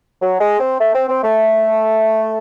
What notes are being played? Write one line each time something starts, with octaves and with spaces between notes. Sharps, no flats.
F#3
G#3
C4
A3
C4
C4
A3